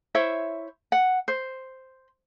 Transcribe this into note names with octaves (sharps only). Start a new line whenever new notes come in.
E4 C5 C#5 E5
F#5
C5